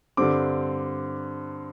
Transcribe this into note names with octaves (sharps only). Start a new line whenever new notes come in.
G2 D3 G3 C4 D6